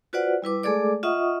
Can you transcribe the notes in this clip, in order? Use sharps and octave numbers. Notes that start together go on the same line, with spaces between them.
F4 F#4 B4 C5 D5 F#5
G3 E4 B4 D6
G#3 A3 G#4 A4 D5 D6
F4 D#5 E5 F#5 C#6 D#6